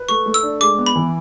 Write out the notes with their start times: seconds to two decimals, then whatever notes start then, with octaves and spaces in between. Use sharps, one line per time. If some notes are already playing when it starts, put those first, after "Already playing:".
Already playing: B4
0.09 A3 C#6
0.26 A3
0.34 E6
0.43 D4
0.60 G#3 D6
0.78 B3
0.86 B5
0.96 E3